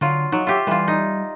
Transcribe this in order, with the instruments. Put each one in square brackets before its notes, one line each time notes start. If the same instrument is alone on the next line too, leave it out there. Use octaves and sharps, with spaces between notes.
[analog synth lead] D3 [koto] F#3 F4
[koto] F#3 [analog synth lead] D#4
[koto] F4 G4 [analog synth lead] E5
[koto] E3 F4 [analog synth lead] G3
[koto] D#4